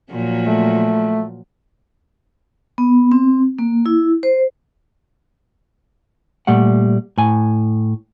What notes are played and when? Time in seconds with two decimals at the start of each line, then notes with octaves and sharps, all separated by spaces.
0.11 A#2 F3 F#3
0.47 A3
2.78 B3
3.12 C4
3.59 A#3
3.86 E4
4.23 C5
6.47 A#2 G3 A3 F#5
7.18 A2 G#5